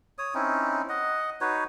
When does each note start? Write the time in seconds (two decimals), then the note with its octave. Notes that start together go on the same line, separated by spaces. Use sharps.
0.18 C#5 D#6
0.34 C4 C#4 D#4 E4
0.89 D#5 F#5
1.41 D#4 F#4 B4 C#5